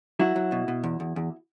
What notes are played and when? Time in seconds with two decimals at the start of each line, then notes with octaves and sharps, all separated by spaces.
0.19 F#3 E4 F#4
0.36 F#3
0.52 B2
0.68 B2
0.84 E2
1.00 E2
1.16 E2